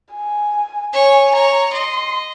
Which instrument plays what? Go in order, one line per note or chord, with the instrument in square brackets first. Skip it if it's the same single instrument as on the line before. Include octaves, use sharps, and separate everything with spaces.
[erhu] G#5
[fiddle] C#5 [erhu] G#5
[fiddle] C#5 [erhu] A#5
[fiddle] D#5 [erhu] C6